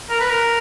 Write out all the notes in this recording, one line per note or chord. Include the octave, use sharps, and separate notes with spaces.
A#4
B4
A#4